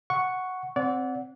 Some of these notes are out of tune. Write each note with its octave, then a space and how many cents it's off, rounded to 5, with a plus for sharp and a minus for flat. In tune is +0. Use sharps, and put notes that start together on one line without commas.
F#5 +0 C#6 +0
C4 +0 D5 -30 F#5 -10